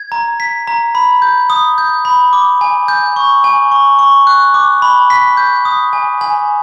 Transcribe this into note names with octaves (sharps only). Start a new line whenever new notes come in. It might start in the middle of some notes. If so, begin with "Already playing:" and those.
Already playing: G#6
A#5
B6
A#5
B5
G6
D#6
G6
B5
D6
G#5
G6
C#6
G#5
C#6
C#6
F#6
D6
B5
B6
G6
D#6
G#5
G#5